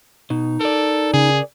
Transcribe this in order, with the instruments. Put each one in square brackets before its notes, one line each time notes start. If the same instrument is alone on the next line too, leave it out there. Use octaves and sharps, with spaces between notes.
[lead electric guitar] B2 [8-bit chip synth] D#4
[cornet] A4 [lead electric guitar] A#4 D5
[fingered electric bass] C#3 [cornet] G#4